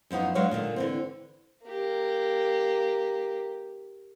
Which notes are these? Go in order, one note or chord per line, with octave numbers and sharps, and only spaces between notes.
F#2 F3 B3 D#4
F#3 G#3 D4 B4 C#5 F5
A#2 D3 D#3 A#3
D3 E3 C4
A#3 G4